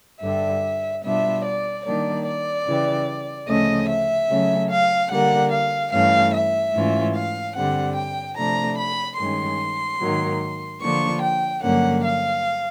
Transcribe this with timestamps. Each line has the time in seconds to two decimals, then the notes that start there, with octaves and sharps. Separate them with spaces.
0.22 G2 D3 G3 E5
1.04 B2 G3 B3 D4 F4 E5
1.45 D5
1.86 D#3 G3 A#3 D4 D5
2.27 D5
2.67 C#3 E3 G3
3.48 D2 C#3 F3 A3 C#4 D#5
3.89 E5
4.30 C#3 F#3 A3 C#4
4.71 F5
5.12 D3 G3 A#3 F#5
5.52 F5
5.93 G2 E3 A3 C#4 F5
6.34 E5
6.74 G#2 E3 A3 C#4 F4
7.16 F5
7.56 G2 D3 G3 C4 F#5
7.96 G5
8.37 C3 F3 A3 D4 A#5
8.78 B5
9.19 G2 D#3 G#3 C#4 C6
10.01 G#2 D#3 F#3 A#3
10.82 D3 F3 A#3 D4 F4 C#6
11.23 G5
11.63 G2 D3 F#3 A#3 C#4 F#5
12.04 F5